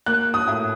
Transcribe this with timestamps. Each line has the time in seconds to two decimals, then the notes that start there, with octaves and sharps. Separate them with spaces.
0.06 A#3 F#6
0.34 D#6
0.47 A2